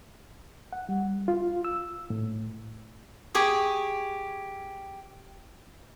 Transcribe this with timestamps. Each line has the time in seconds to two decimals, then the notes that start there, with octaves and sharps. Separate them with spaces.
0.73 F#5
0.89 G3
1.28 F4
1.65 E6
2.10 A2
3.34 G4 G#4 C#6 D#6